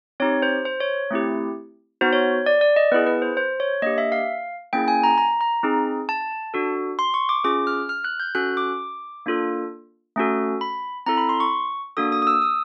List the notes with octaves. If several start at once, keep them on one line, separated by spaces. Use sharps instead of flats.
C4 D#4 G4 C#5
C5
C5
C#5
A3 C4 E4 G4
B3 D#4 F#4 C5
C#5
D5
D5
D#5
B3 E4 G#4 B4
B4
C5
C5
C#5
A#3 D4 G4 D#5
E5
F5
A#3 C#4 E4 G#4 G5
G#5
A#5
A#5
A#5
C4 D#4 G#4
A5
D4 F#4 A4
C6
C#6
D6
C#4 F4 G#4 D6
F6
F6
F#6
G6
C#4 F#4 A4 F#6
D6
A#3 D4 F4 A4
A3 C#4 F#4 A4
B5
C4 E4 A4 A#5
B5
C6
C#6
A#3 D4 F#4 A4 D#6
D#6
D#6
E6
D#6